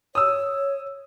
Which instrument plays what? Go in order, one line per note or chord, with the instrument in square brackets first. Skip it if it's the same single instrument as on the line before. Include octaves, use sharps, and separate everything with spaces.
[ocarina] C#5 [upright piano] D#6 E6